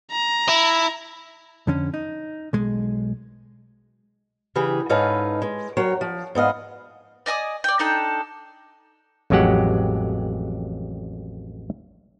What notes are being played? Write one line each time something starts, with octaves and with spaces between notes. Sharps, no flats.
A#5
E4
F2 D3 C#4
D#4
B1 G#3
C#3 E3 G4 G#4
G#2 C#4 D#4 A4 B4 F5
G#3
F#3 A#4 C#5 G5
F3
G#2 B3 D#5 F5
D5 D#5 G#5 D#6
D5 G5
D4 D#4 A4 G5
A1 F2 F#3 G#3 G4 F#5